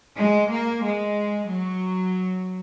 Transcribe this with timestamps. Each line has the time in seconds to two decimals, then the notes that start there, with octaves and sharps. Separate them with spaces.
0.18 G#3
0.52 A#3
0.84 G#3
1.49 F#3